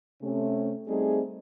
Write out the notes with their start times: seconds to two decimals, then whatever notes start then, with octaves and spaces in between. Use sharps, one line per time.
0.22 C3 A3 C#4
0.88 G3 A3 C4 D#4 G#4